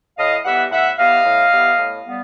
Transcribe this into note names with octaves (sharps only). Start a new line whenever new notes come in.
A2 D#5 F5
E3 G3 B3 E5 F#5
A2 E5 F#5
E3 G3 B3 D#5 F5
A2
E3 G3 B3
A2
G3 B3